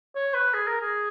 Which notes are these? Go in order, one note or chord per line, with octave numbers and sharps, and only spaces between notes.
C#5
B4
G#4
A#4
G#4